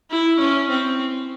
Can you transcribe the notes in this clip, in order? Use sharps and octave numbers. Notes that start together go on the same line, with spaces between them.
E4
C#4
C4